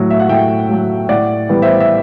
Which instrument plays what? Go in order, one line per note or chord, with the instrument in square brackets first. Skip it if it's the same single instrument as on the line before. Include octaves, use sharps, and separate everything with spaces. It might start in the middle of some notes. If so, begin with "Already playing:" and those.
Already playing: [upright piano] A2 F#3 A3
E5
F#5
A2 E5 G5
F#3 A3
A2 D5 F#5
E3 G3 B3
C5 E5
E5